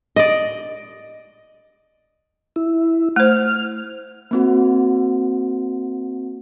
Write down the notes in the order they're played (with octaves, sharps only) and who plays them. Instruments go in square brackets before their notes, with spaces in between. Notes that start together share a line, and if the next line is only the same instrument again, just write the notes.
[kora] D5 D#5
[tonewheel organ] E4
[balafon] A3 C5 [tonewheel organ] F6
[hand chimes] A#3 C4 F#4